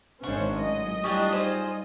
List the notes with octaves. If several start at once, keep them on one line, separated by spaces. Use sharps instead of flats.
G#1 G#3 C#4 D4 C5 C#5 F#5 C#6
A2 F#3 D#5
G3 C#4 D4 E4 F4 G4
D#4 F4 G#4 C5